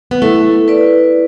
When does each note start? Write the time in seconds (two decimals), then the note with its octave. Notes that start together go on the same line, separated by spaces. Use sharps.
0.11 B3
0.22 A3 E4
0.68 B4 D5